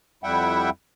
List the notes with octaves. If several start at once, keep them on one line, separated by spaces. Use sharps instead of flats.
F2 G3 E4 E5 F#5 G5